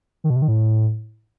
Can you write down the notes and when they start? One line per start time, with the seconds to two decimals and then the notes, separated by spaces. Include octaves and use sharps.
0.24 D#3
0.30 B2
0.36 C3
0.42 D#3
0.48 A2